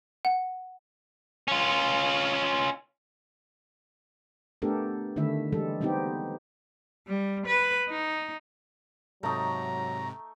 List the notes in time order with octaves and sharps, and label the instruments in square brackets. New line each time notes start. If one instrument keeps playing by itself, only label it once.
[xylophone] F#5
[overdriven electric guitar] C#4 F4
[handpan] A3 B3 D4 G4 A4 A#4
D3 D#3 A3 E4 E5
E3 G3 G#3 A4
G3 B3 C4 D#4 G4
[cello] G3
B4
D#4
[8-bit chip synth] G#2 C3 [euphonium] F#3 [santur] A3 D#4 [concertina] A#5